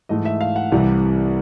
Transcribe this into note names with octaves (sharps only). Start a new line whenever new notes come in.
G#2 E3 A3 D#5
E5
F5
F#5
C2 C3 E3 G3